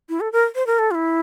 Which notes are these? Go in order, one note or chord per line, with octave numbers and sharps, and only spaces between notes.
E4
A4
A#4
C5
A#4
A4
F4
E4